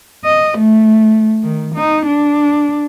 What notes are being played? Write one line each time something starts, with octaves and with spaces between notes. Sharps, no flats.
D#5
A3
D#3
D#4
D4